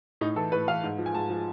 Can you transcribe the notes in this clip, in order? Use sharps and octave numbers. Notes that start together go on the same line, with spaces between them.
A2 D#4
E3 A4
A2 B4
E3 F5
G#2
F3
G#5
G#2 A5
F3